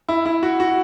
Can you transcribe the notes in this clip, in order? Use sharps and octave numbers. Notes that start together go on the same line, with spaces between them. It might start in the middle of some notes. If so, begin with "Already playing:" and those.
E4
E4
F#4
F#4